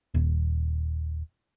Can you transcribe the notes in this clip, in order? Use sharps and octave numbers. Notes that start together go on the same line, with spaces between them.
D#1